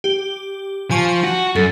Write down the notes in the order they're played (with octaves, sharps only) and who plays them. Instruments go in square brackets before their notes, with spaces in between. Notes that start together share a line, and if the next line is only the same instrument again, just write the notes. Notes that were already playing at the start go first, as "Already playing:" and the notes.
[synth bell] G4
[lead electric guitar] F3 [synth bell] G#5 A5 C#6
[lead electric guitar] F#4
[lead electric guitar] F#2 [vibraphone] A4